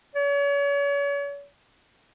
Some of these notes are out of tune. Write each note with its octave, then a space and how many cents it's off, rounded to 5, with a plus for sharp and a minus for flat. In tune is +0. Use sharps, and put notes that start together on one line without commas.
C#5 +40